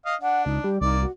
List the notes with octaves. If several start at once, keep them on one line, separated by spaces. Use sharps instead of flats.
D#5 F5
D4 F#5
C#2 D#4
G3 G4
C2 A#3 D#4 D5
F#4